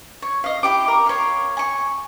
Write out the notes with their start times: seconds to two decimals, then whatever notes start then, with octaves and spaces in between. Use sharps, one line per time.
0.22 C#5
0.44 D#5 F5
0.63 E4 G4 D6
0.88 A#4
1.06 C#5 F5
1.57 G#5 C#6